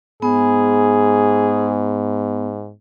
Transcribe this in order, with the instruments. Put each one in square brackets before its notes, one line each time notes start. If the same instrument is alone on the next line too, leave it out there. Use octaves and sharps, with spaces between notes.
[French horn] G#2 [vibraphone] B3 [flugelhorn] G#4